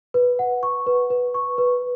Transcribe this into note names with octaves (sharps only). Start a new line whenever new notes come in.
B4
F#5
C#6
B4
B4
C#6
B4